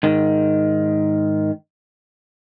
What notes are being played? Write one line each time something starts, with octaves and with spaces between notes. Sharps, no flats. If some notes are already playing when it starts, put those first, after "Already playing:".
G#2 D#3